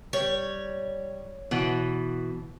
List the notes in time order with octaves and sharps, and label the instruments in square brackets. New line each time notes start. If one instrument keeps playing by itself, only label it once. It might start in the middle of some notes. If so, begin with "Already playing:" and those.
[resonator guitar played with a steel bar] G3 [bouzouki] C#5
[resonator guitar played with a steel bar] B2 E3 F#5